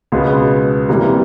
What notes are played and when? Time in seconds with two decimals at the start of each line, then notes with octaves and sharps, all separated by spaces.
0.12 C#2 B2 G#3 B3
0.89 C3 E3 G3 A#3